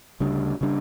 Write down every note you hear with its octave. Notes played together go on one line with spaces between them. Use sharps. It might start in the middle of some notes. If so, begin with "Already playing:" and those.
D2 C#3 G3 D4
C#3 G3 D4